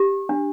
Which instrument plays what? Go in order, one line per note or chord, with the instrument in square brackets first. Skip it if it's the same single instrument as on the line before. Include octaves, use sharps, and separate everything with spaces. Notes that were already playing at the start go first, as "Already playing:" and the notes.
Already playing: [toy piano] G4
D4